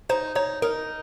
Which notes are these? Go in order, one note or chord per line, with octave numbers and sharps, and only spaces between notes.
D#4 C5
D#4 C#5
D#4 A#4